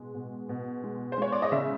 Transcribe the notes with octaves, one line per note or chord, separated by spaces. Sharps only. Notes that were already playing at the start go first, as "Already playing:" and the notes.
Already playing: B2 G#3
B2
B2
G#3
C5
G#3 C#5
D5
D#5
C#3 E5